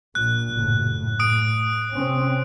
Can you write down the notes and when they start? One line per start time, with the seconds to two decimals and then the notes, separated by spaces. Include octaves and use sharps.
0.15 A#1 A#2 F#6
0.53 F#1 A2
0.86 A2
1.20 D#6 D7
1.93 C3 C4 C#4